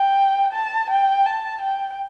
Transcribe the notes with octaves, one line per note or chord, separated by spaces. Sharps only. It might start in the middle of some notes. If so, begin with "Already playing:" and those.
Already playing: G5
A5
G5
A5
G5